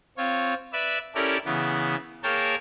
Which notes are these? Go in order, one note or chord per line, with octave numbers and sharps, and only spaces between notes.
C4 F4 C#5
B4 D5 E5
C#4 E4 G4 A4 A#4 D5
C#3 E3 B3
A#3 G#4 A#4 C#5 G5 A5